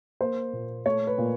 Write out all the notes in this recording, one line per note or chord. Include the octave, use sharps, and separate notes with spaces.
A#3 C5
A#2
A3 C#5
B4
A#2